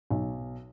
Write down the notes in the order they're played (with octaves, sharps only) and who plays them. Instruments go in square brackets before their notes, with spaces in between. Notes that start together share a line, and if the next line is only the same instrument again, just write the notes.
[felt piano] B1